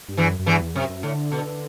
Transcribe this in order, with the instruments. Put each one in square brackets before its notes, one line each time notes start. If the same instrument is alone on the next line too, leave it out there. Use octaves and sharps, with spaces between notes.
[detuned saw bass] G2
[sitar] E2 E3
[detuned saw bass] F#2
F#2
[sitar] E2 E3 [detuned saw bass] G2
[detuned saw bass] E2
[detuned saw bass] F#2 [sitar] C3
[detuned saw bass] F#2
[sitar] A2 [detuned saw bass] D3
[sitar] B2